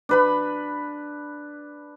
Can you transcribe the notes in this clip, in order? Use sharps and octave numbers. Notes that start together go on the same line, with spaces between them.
D4 B4 B5